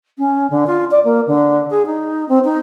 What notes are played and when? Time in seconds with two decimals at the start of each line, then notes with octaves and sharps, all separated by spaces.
0.18 C#4
0.50 D3
0.66 F4
0.91 D5
1.04 A#3
1.27 D3
1.70 G#4
1.85 D#4
2.28 C4
2.44 D#4